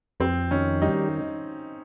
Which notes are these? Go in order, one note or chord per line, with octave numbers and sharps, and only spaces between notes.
F2 C4
D#3 C#4
G3 D#4